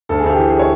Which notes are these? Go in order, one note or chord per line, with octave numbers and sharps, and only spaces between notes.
D2 A4
G#4
D2
G4
E3
G#4
C#5